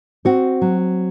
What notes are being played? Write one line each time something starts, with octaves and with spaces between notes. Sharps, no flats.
C4 F#4
F#3